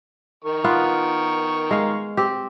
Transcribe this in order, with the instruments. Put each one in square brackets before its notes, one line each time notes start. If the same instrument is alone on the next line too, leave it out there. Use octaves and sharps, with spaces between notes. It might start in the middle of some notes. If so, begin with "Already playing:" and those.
[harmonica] D#3 A#4 C#6
[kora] B3 F4
G#3 F5
C4 G4